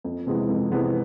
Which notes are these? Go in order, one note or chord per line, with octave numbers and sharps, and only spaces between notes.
F2
C3 E3 G#3 B3
F2
C3 E3 G#3 B3